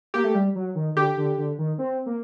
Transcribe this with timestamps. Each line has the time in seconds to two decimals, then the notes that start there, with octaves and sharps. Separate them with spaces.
0.14 A#3 G4
0.24 A3
0.35 G3
0.55 F#3
0.75 D#3
0.95 D3 G4
1.17 D3
1.38 D3
1.58 D#3
1.78 C4
2.06 A#3